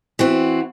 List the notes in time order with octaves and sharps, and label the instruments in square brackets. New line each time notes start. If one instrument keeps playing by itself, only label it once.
[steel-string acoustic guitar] E3 C4 F#4